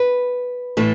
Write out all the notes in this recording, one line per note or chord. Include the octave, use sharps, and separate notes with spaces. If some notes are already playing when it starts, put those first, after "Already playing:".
Already playing: B4
A2 E3 A3